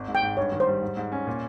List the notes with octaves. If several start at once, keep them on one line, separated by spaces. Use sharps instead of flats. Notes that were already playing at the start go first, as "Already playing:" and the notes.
Already playing: G#1
G#2
G5
G#2
G2 C#5
D#3
C5
G3
G#2
G#2
C#4
A#2